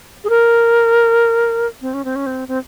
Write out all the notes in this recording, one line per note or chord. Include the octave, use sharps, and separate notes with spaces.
G#4
A#4
C4
C#4
C4
C#4
C4
C4